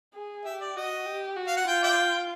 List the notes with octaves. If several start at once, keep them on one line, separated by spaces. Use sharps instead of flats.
G#4
G4 E5
D5
F#4 D#5
G4
F#4
F5
F#5
F4 G5
D5 E5 G5